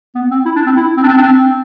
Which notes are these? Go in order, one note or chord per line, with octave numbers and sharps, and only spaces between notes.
B3
C4
E4
D4
C4
E4
C4
D4
C4
D4
C4